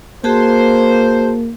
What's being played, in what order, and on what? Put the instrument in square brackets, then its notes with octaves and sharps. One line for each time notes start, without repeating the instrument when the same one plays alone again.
[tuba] A#3 [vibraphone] F#4 G#4 A5 [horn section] C5